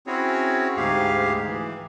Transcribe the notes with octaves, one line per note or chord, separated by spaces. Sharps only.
C4 C#4 E4 F#4 G#4 C#5
D2 G#2 G4 G#4 F5
E3